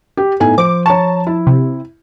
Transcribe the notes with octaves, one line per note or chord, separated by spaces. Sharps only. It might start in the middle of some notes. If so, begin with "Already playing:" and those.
G4
A2 B3 D#4 A4 G#5
F3 C5 D6
C#5 A5 A#5 C#6
E4
C3